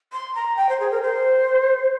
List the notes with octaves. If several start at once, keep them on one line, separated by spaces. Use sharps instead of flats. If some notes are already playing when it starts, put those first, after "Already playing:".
C6
A#5
G5
C5
G#4
A#4
C5